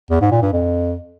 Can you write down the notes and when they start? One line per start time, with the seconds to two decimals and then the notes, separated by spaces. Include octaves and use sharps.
0.10 E2
0.21 G#2
0.32 A#2
0.42 G2
0.53 F2